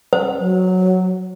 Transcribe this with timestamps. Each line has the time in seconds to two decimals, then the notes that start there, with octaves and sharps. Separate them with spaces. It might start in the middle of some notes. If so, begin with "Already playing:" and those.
0.13 C5
0.40 F#3